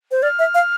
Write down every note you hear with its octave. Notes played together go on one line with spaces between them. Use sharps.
C5
D5 F6
E5
F5